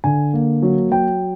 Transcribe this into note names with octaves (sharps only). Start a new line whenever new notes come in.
D3 G#5
A#3
F#3
F#3 G5